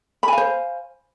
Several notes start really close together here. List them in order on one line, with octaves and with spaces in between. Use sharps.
B5 G#5 F5 C5